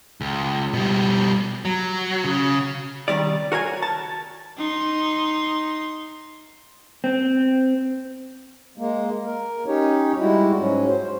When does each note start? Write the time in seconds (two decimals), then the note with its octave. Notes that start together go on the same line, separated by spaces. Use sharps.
0.21 C#2
0.73 B2 G3
1.65 F#3
2.25 C#3
3.08 C2 D#3 G3 D5
3.52 F#4 A#4 C#5 G#5
3.83 A5
4.58 D#4 C6
7.04 C4
8.78 G#3 A#3
9.24 A#4
9.67 C#4 D#4 G4 C#5
10.18 G3 G#3 E4 F#4
10.58 G#2 F#3 C#4
10.88 C5